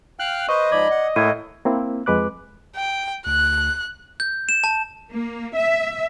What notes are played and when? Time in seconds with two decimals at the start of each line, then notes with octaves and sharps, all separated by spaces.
0.19 F5 G5 F6 F#6
0.49 B4 C5 D#5 C#6
0.72 G#2 F3 D5 B5 D6 G#6
0.91 F#5
1.16 A2 A#3 A#4 E6 G#6 D#7
1.65 A#3 C4 E4
2.06 F2 G#3 B4 D6 F#6
2.76 G5
3.26 D2 F#6
4.20 G6
4.49 E7
4.64 A5
5.11 A#3
5.55 E5